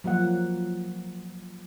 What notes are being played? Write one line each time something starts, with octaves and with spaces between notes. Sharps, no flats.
F3 F#3 A#3 F#5